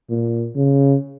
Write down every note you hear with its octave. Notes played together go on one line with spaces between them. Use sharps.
A#2
C#3